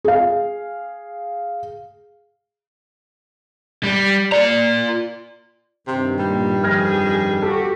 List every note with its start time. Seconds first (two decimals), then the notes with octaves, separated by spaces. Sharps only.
0.04 G#4 F5
3.84 G3
4.32 F4 D5 A#5
5.87 G2 C3 D#3
6.19 A#2 G3
6.63 F2 G#4 F6 G#6 A#6
7.42 F#4 G4 A4